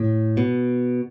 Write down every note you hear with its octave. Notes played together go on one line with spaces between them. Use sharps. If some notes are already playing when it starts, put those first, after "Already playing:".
Already playing: A2
B2